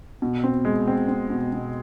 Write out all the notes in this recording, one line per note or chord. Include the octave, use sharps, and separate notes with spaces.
B2
C4
G#3
C4
C4
B2
B2